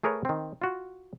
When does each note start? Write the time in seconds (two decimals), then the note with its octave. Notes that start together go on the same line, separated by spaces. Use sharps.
0.03 A3 G#4 A#4 B4 C#5
0.25 D#3 C4
0.62 F4 F#4